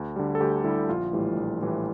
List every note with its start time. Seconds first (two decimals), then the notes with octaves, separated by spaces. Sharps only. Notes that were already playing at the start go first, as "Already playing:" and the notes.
Already playing: D2
0.16 D3 G3
0.35 A4
0.40 D2 G4
0.64 D3 G3 E4
0.89 A#1 F4
1.13 A2 E3 G3
1.37 A#1
1.61 A2 E3 G3